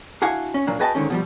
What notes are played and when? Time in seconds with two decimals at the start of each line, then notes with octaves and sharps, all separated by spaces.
0.22 D4 E4 F#4 F5 F#5 G#5
0.54 C#4
0.67 A#2 F#3 A#3 D4
0.80 F#4 G#4 B4 D#5 G5 A5
0.95 G#2 D3 D#3 C#4
1.10 B2 F3 G3